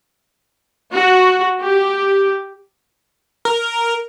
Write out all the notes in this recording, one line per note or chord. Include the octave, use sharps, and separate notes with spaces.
F#4
G4
A#4